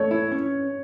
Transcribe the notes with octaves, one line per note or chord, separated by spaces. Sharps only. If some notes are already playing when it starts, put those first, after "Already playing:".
Already playing: A3 C#5
E4
C#4